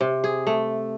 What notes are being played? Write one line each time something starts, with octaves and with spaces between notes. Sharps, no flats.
C3
G#4
A3